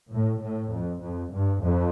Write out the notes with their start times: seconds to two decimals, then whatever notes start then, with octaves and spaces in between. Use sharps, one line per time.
0.11 A2
0.40 A2
0.72 F2
1.00 F2
1.32 G2
1.61 F2